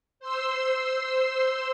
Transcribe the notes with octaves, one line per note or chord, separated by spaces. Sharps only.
C5 C6 E6